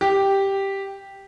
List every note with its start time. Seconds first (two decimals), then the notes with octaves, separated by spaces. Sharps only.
0.01 G4